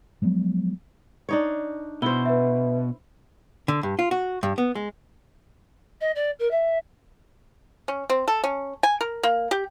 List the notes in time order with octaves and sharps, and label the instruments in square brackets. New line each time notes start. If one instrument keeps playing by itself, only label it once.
[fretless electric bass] F3 F#3 G#3 B3
[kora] D4 D#4 C#5
[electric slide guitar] B2 [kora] E4 C5 [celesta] G7
[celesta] B4 E5
[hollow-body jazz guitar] D3
G2
F4
F#4
G2
B3
G#3
[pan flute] D#5
D5
A#4
E5
[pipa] C#4
C4
A4
C#4
G#5
A#4
A#3
G4